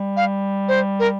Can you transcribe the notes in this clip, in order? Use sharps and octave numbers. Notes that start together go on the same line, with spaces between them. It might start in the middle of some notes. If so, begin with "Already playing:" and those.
Already playing: G3
F5
C5
A#4